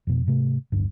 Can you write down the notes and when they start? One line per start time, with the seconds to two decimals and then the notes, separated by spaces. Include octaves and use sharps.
0.07 F2 B2
0.26 G#2 C3 A3
0.72 D1 G1 G2